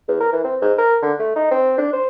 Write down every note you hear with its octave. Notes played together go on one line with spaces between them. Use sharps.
E2
A#4
E3
C4
G#2
A#4
D3
A3
D#4
C4
D4
C5